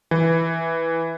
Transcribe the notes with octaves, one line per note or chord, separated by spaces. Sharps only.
E3